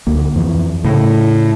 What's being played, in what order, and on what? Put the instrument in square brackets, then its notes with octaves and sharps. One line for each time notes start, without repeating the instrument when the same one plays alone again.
[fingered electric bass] D2 A#3
F2 E3
[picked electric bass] A2 [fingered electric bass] C#3